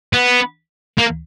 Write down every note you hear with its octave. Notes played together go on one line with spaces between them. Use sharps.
B3
A#3